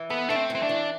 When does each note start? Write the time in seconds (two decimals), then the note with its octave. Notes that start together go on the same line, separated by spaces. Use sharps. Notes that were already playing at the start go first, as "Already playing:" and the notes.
Already playing: E3
0.10 B3 A4
0.29 A3 D4
0.36 C4
0.50 E3 C4
0.63 D4
0.69 E3